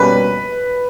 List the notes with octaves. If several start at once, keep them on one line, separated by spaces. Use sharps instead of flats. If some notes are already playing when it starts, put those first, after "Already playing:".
Already playing: B2 G3 A#3 C#4 B4